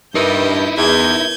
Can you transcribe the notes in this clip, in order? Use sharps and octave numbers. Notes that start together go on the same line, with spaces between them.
G2 D#4 E4 A#4 B4 G6 D#7
E2 G6 G#6